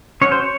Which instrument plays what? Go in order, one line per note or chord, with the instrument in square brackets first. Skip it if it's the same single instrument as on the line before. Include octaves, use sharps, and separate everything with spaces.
[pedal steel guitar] F#3 C#4 C#5
C5
C#5